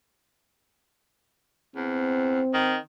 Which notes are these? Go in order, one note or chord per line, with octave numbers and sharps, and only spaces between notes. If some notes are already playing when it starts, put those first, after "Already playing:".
E2 C4
D#3